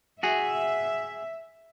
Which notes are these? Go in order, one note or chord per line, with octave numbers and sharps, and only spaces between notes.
F#4 G#4 E5